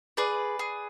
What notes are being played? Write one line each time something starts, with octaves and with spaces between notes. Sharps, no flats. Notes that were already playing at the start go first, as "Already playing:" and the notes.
G#4 B4 D5
G#4